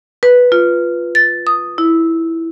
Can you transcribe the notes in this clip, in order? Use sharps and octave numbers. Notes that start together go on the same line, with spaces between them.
B4
F4
A6
D#6
E4